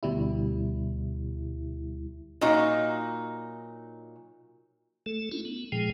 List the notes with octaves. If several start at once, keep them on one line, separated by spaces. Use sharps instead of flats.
D2 B2 G3 E4
A#2 F#3 D#4
A3 A4
C#4 D4 E4 F4
B3
A#2 F3 G#3 G#4 G5